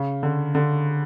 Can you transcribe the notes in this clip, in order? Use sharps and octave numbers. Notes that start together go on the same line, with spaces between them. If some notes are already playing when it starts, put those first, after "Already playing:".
Already playing: C#3
D3
D3